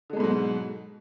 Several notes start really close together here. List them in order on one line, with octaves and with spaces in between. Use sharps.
D3 G#3 B2 G#2 F#3